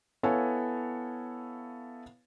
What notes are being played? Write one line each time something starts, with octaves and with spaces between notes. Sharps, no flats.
B3 E4 A4 C#5 F5 G#5